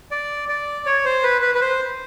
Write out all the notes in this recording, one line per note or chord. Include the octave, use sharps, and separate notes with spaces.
D5
D5
C#5
C5
B4
B4
B4
C5